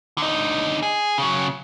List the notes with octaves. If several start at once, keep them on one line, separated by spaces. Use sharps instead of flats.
D3 D#4
G#4
C#3 F#3